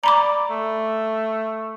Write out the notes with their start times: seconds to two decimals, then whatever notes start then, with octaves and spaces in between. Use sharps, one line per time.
0.04 D5 A#5 B5 D6
0.50 A3